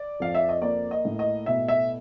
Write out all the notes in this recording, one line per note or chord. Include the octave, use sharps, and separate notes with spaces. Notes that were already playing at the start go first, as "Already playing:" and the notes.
Already playing: D5
F2 F5
E5
D#5
A#3 D5
D#5
A2
D#5
B2 E5
E5